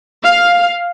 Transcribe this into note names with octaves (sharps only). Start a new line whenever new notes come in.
F5